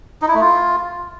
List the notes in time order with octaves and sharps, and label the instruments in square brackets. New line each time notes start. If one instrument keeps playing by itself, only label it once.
[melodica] D#4
E4
A3
F4